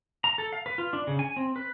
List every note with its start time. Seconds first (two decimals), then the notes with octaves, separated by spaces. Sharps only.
0.24 A#5
0.38 A4
0.53 F5
0.66 B4
0.78 F4
0.93 D4
1.07 C#3
1.19 G#5
1.37 C4
1.56 B4